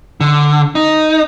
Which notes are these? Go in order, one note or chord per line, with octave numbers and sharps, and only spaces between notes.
D3
D#4